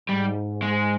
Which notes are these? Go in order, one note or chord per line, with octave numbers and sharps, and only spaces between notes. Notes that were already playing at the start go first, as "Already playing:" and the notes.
G#2 G3
G#3